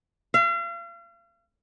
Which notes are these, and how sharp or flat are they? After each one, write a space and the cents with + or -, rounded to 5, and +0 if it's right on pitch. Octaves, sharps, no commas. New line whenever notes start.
F5 -40